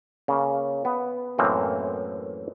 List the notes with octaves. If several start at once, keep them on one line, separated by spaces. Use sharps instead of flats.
C#3 A#3
B3
F#2 A2 E3 A#3 C4